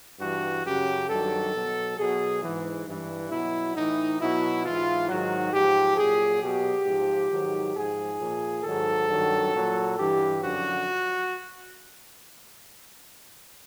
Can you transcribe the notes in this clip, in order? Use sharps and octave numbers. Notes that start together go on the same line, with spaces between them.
G2 E3 F#4
F#2 C#3 F#3 G4
G2 D#3 F#3 A4
B2 F#3
B2 F#3 G#4
G#2 E3
G2 E3
B2 F#3 E4
A2 E3 D#4
B2 F#3 E4
G#2 E3 F4
G#2 D#3 F#3 F#4
G#2 F3 G4
A#2 F#3 G#4
B2 F#3 G4
G#2 F3
G#2 D#3 F#3
G#2 F3 G#4
A#2 F3
G#2 D#3 F#3 A4
G2 D#3 F#3
A#2 F#3
G2 E3 G4
F#2 D3 F3 F#4